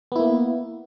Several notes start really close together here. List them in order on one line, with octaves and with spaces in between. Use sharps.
B3 E4 A#3